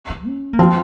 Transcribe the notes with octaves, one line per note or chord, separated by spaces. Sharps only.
D#3
C#4
A#3
F3 C4